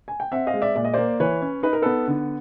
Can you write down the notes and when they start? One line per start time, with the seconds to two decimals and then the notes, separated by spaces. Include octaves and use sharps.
0.08 G#5
0.20 G5
0.32 C4 E5 F#5
0.47 D#5 F5
0.54 G#3
0.62 D5 E5
0.76 A#2 D5
0.85 D#5
0.94 A#3 C5 D5
1.20 E3 B4 C#5
1.42 C#4
1.63 D#4 B4
1.73 A#4
1.82 B3 A4 B4
2.08 D3